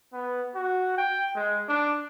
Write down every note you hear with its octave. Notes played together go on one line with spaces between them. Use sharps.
B3
F#4
G5
G#3
D4